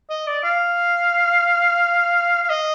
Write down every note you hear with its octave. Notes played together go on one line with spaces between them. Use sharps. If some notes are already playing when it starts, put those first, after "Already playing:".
D#5
D5
F5
F5
D#5